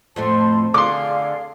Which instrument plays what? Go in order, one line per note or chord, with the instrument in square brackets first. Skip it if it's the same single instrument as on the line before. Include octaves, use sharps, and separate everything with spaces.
[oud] F2 A2 A3 [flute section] C5 A5 C6
[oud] D3 [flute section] G#4 D5 F5 [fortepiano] C6 D6